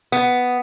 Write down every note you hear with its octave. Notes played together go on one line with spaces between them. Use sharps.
B3